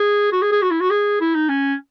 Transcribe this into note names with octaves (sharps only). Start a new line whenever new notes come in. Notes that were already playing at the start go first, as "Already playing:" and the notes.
Already playing: G#4
F#4
G#4
G#4
F#4
E4
F#4
G#4
E4
D#4
C#4